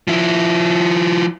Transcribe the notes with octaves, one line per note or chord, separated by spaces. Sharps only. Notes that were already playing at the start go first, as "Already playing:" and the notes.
F3 E4